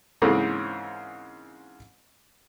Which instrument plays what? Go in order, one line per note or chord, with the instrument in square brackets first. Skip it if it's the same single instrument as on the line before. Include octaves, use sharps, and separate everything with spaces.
[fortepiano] G#2 C#3 E3 A#3 C4